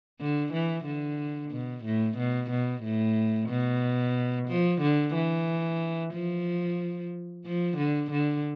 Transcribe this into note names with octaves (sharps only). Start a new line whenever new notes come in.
D3
E3
D3
B2
A2
B2
B2
A2
B2
F3
D3
E3
F3
F3
D3
D3